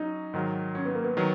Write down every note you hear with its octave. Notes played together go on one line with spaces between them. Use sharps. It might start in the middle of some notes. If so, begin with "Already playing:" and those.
Already playing: F#3 C#4 D#4
G#2 D#3 F#3
C#4
B3
A#3
B3
D#3 F#3